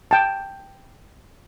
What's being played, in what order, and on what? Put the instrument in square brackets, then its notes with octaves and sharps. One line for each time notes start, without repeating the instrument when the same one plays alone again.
[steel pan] G5 A5